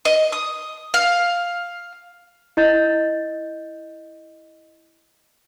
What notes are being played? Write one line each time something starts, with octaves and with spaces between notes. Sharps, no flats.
D#5
D#6
F5
E4 D#5 G6 A6